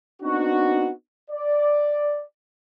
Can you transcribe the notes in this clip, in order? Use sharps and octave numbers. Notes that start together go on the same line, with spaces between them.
B3 C4 D4 D#4 F#4
D5